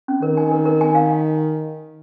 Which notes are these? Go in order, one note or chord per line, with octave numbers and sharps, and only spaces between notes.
C#4
D#3 A#4
G#5
A#4
A#4
G#5
F5